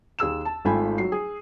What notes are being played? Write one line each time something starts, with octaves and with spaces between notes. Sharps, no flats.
D#2 G#4 E6 E7
A5
G#1 A3 F4 G5 G#5 B5
F#3 C7
G#4